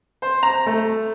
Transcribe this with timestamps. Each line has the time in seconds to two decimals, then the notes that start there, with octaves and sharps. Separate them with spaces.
0.22 C5
0.43 A#5
0.66 A3